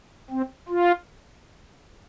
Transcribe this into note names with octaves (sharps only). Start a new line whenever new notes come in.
C4
F4